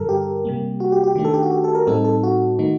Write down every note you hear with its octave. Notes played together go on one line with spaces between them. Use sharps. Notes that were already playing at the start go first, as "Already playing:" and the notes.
Already playing: G2 D3 G3 A4 A#4
G4
C3 G3 A#3
F#4
G4
G4
D#3 A3 D4 G4
A4
G4
F#4
G4
A4
A#4
A2 G3 C4 D#4 A4
A4
F#4
D#3 A3 D#4